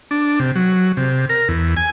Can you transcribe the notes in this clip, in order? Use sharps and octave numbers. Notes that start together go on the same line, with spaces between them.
D4
C3
F#3
C3
A#4
E2
G#5